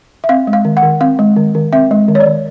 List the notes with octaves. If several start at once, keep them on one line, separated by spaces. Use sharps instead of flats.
E5
C4 F5
G#3
F5
D#3
F#5
D#3
C4 F5
G#3
D#3
D#3
C4 E5
G#3
D#3
C#5
D5
D#3